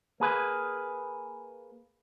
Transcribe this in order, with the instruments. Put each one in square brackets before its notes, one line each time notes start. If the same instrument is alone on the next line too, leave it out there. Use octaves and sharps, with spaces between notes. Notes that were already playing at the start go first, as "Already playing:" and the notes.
[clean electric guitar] A#3 G#4 B4